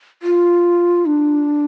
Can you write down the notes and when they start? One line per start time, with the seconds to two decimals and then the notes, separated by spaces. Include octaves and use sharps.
0.23 F4
1.06 D4